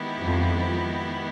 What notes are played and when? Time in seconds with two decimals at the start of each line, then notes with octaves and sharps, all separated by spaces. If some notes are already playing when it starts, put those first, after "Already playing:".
Already playing: D#3 G#3 B3 E4 G4
0.22 F2 F3